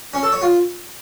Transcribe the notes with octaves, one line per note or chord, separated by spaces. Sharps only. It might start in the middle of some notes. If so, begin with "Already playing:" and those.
C#4
A4
C#5
F4